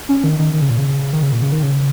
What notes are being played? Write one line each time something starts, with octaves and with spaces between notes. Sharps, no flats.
C#4
D#3
D#3
D#3
C#3
A#2
C#3
D#3
C#3
A#2
C#3
D#3
C#3